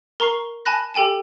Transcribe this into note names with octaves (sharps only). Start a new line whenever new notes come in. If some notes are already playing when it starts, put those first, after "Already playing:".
A#4 A#5 C#6 C7
G#5 A5 B5 F#6 A#6
G4 A4 G5 G#5 E7